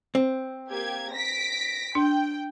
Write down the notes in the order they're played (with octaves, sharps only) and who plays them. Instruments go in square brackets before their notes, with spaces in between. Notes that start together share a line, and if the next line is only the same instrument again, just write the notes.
[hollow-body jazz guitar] C4
[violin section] A#3 G4 G#6
A#6 B6 D7
[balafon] D4 [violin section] G5